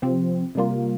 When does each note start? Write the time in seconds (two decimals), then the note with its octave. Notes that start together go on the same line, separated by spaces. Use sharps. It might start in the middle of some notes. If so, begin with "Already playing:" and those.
0.02 C3 F3 C4
0.55 C3 G3 A#3 F4